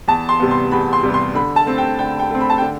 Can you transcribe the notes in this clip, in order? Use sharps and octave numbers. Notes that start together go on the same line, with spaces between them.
E2 A5
C6
C3 G3 B3
C6
E2 B5
C6
C3 G3 B3
C6
D3 B5
A5
A3 C4
G5
D3 G5
G5
A3 C4
B5
A5
D3 G5